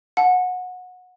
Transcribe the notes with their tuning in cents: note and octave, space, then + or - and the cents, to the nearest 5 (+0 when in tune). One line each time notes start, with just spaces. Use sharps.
F#5 -20 A5 -25